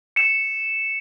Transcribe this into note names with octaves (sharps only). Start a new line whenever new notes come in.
C#7 E7